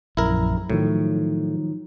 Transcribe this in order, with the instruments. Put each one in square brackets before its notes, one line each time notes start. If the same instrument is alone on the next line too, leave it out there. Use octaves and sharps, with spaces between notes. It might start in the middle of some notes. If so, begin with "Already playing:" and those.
[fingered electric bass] A#1 F#2 [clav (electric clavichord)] E4 A#4
[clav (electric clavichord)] A2 [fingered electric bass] D#3 F3 F#3